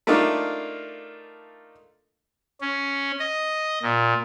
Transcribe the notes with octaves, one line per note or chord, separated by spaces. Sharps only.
A3 A#3 D4 D#4 F4
C#4
D#5
A#2